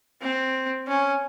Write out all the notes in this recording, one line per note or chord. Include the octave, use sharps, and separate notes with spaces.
C4
C#4